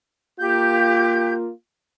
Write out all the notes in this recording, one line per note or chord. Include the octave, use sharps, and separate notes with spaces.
A#3 F4 G4 G6